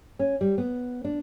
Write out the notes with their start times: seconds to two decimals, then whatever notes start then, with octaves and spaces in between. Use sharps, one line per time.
0.19 C#4
0.41 G3
0.58 B3
1.04 D4